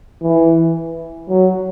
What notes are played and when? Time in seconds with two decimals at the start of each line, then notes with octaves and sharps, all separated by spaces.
0.22 E3
1.29 F#3